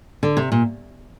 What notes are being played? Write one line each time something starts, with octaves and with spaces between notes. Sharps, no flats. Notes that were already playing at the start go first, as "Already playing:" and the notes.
D3
C3
A#2